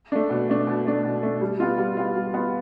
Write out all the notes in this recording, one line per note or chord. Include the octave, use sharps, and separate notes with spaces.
A3 D4
B2
A3 D4
B2
A3 D4
B2
A3 D4
G3
B3 F4
G3
B3 F4
G3
B3 F4